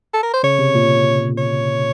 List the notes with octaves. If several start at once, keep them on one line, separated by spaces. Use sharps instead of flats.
A4
A#4
C5
C#3 C#5
C3
A#2
C#5